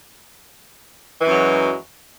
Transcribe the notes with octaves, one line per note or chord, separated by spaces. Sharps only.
F#2 E3 F#3 G#3